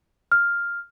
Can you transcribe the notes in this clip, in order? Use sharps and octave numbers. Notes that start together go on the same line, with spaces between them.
F6